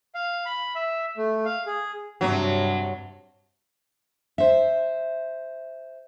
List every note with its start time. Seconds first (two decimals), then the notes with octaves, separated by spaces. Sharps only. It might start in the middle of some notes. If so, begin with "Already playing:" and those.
0.15 F5
0.46 B5
0.75 E5
1.17 A3
1.45 F5
1.66 G#4
2.21 G2 C3 F#3
4.38 C5 E5